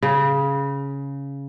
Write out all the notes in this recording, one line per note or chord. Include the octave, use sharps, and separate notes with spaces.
C#3